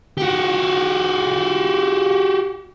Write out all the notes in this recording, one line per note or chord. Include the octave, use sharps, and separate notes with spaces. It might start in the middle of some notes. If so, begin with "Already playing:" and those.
F#4 G4